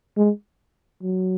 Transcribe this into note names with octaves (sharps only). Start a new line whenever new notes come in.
G#3
F#3